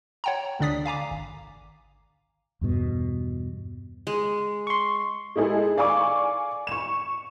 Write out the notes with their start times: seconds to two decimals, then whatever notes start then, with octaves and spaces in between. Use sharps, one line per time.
0.24 C#5 F#5 G5 A5 A#5
0.59 D2 D3 D4 D5 D#6 B6
0.86 F5 G#5 A#5 D6
1.11 G#1
2.61 E2 G2 B2
4.07 G#3
4.67 C6 C#6
5.36 G#3 D#4 E4 G#4 A4
5.77 D5 F5 G#5 C#6 D6
6.67 C#6 E7